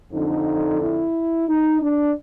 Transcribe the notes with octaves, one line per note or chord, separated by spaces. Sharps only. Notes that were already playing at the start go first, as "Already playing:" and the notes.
F2 D3 D#4
E4
D#4
D4